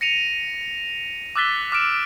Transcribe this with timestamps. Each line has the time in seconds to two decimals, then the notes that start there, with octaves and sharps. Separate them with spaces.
0.01 A#6 C#7 D#7 F7
1.36 D6 E6 F#6 A6 B6 G7
1.72 D6 F6 B6 D7 E7